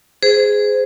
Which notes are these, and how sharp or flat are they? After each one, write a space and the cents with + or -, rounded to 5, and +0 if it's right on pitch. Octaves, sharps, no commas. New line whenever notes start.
G#4 +0 C5 -25